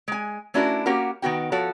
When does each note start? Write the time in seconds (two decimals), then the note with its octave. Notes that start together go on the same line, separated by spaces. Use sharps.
0.08 G#3 G#5
0.54 A3 C#4 D4 E4 F#4 A#4
0.86 A#3 C#4 F#4 G4 A#4
1.22 D#3 B3 F#4 G5
1.52 F3 F#4 A4 C#5